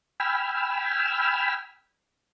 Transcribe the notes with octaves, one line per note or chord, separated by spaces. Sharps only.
G5 G#5 B5 E6 F6